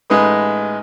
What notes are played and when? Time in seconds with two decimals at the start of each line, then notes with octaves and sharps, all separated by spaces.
0.10 A1 G#3 D#4 B4 D#6